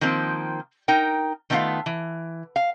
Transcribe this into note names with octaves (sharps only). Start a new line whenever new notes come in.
D#3 F3 A#3 C4
D#4 A#4 G5
D#3 A3 B3 C4 F4 F5
E3
F5